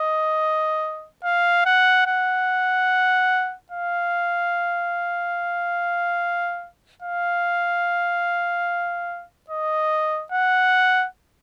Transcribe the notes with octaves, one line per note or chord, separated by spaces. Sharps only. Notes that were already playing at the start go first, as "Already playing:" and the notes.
Already playing: D#5
F5
F#5
F#5
F5
F5
D#5
F#5